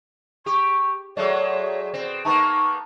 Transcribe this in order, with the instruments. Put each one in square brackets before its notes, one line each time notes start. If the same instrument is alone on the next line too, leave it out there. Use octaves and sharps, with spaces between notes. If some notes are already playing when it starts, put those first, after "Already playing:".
[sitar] G4 [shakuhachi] C#6
[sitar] F#3 G#3 A3 [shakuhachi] C#5 [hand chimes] D5
[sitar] B2 C4
[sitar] A#3 B3 D#4 [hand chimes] A5 A#5 [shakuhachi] C#6